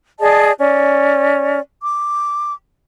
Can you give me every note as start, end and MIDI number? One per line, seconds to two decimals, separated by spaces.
0.20 0.51 68
0.20 0.51 74
0.20 0.51 75
0.20 0.51 81
0.58 1.60 61
0.58 1.60 74
1.82 2.51 86